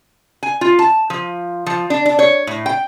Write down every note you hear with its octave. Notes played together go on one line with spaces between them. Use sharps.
G#5
F4
A5
F3
F3
D4
D4
C#5
A2
G5